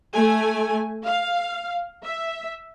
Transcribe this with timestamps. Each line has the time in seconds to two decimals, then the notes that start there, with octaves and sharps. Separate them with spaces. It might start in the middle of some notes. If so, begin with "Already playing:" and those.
0.12 A3 G#5
1.05 F5
2.03 E5